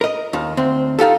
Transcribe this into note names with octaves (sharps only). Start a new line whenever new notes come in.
A#4 D#5
D#2 D#3
D2 C4
D#4 F4 G4 A4